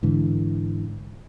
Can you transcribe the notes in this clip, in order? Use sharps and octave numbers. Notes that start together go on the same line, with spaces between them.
G#2 D3 E3